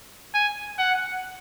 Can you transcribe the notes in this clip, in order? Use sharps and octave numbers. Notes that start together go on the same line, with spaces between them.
G#5
F#5